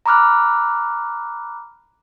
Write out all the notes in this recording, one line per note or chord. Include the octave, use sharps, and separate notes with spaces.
A#5 B5 D6 F6 F#6